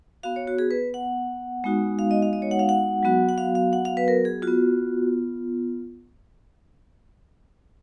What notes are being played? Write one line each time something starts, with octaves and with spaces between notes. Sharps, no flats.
B3 F#4 F5
C#5
F#4
G#4
B4
F#5
G#3 B3 D#4 F#4
F5
D#5
F5
D#5
C#5
F#5
F5
F#5
F#3 B3 F#4
F#5
F5
F5
F#5
F5
B4
A#4
G#4
B3 F4 F#4